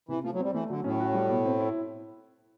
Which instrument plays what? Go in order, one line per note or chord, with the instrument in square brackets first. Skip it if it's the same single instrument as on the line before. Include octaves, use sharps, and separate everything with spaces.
[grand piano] C3 [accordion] E3
[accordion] F3 [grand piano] A3
[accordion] F#3
[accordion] G3 [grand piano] C4
[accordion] E3 [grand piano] A3
[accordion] D3 [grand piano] F#3
[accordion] A2 [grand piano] C#4
[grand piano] F#4
G3
B2
C4
E4